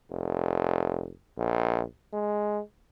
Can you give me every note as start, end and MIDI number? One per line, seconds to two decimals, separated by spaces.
0.11 1.13 29
1.37 1.83 34
2.13 2.61 56